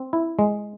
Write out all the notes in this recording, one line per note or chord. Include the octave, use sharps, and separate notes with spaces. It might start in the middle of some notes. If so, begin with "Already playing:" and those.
Already playing: C4
E4
G#3